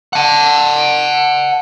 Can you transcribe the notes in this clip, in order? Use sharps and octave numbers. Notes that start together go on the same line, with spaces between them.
F#5 A5